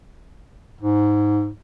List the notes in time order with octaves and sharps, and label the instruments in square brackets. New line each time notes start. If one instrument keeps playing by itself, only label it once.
[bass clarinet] G#2